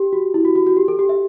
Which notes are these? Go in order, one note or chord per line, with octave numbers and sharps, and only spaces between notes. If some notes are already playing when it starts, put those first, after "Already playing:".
Already playing: G4
F#4
E4
F#4
F#4
F#4
G4
A4
G4
E5